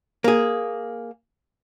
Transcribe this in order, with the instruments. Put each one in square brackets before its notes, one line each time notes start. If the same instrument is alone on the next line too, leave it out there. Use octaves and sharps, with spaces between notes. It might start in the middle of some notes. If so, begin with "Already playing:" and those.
[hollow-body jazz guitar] A#3 G#4